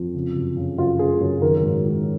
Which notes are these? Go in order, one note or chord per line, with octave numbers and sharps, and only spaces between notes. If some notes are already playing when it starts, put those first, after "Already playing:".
Already playing: F2
C#3
F#2
C#3
F#2 F4
C#3 G#4
F#2
D#3 A#4
G#2
D#3